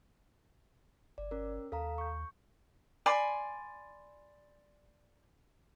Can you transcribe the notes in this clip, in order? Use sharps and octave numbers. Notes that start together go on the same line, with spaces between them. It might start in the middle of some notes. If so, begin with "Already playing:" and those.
G1 D5
C#4 A#4
D#2 A4 F5 A#5
C#6 G6
D5 G#5 B5 C6